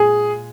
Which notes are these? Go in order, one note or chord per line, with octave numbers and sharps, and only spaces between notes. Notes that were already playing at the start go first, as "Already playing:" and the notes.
Already playing: A#2 G#3 G#4